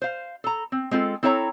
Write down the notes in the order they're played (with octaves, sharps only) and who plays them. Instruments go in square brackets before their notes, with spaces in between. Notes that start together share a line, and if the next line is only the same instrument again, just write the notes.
[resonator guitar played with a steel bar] C5 F5
A4 A#5
C4
G#3 C4 F4 A4
C4 E4 A4 C#5 E5 A#5